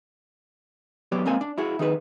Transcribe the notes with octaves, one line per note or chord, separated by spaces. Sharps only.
F#3 B3 G4 D5
G#2 A#3 C4 A#4 F5 G#5
D4
E4 F#4 G#4
D#3 D#4 G#4 B4